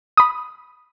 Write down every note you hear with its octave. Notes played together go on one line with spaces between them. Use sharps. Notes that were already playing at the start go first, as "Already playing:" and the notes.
B5 D#6